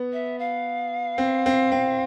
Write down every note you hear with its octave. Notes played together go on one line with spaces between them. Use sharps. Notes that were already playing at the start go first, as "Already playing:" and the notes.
Already playing: B3
E5
F5
C4
C4
C4